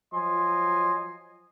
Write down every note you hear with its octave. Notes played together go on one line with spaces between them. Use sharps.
F3 F#3 D#5 G#5 C6